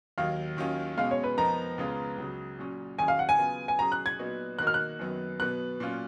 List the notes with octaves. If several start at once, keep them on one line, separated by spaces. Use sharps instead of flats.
D#2 D#3 F#3 F5
D#2 D#3 F#3 C#4 F4
B2 G#3 C#4 F5
C#5
B4
F2 F3 B3 D#4 A#4 A#5
C#2 C#3 G#3 B3 F4
C#2 C#3 F#3
A#2 F#3 C#4
D#2 D#3 F#3 C#4 G#4 G#5
F5
F#5
G#5
C#3 F#3 B3 F4
G#5
F#3 C#4 G#4 A#5
F#6
G#6
A#2 F#3 B3 D#4 F#4
D#3 A#3 D#4 F#4 A#4 F#6
F6
F#6
F#2 D#3 F#3 B3
B2 F#3 B3 F#6
A#2 F#3 C#4 F4